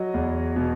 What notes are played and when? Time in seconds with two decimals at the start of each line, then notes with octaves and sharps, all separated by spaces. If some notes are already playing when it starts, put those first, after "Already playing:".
Already playing: F#3 D#5
0.14 E2
0.56 B2